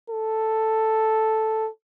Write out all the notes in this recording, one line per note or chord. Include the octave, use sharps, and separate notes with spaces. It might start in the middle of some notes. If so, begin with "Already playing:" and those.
A4